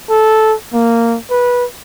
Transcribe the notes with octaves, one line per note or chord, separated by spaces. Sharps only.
A4
A#3
B4